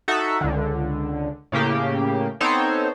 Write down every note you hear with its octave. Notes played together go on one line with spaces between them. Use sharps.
D#4 F#4 A4 E5 F#5
C#2 D3
A2 C#3 A#3 G4
B3 C4 D#4 A4 C5 C#5